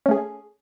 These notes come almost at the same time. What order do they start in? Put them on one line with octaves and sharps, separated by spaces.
C#4 A3 G#4